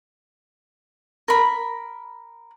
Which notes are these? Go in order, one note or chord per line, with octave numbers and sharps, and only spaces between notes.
A#4 B5